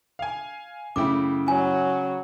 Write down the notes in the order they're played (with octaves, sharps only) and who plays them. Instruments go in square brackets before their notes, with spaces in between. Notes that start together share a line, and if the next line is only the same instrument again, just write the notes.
[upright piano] F5 G#5
[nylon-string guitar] F#2 A3 E4 [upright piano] C#3 G5 [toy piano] D6
[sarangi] F#3 [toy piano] G#5